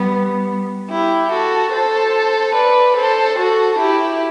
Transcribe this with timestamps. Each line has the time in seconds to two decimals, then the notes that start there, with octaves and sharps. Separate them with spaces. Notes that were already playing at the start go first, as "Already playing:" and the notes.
Already playing: G3 B3
0.90 E4 G4
1.31 F#4 A4
1.73 A4 C5
2.55 B4 D5
2.97 A4 C5
3.38 F#4 A4
3.79 E4 G4